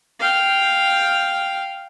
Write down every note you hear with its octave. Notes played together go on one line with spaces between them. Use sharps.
F5 G5